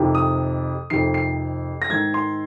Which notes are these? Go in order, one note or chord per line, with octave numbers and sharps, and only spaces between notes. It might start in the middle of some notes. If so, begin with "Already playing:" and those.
Already playing: F2 C3 D#3
D#6
F2 C3 D#3 C7
C7
A#6
G#2 D#3 G#6
C6